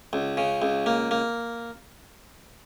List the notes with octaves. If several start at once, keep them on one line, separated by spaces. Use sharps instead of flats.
C#2
C#3
C#2
A#3
A#3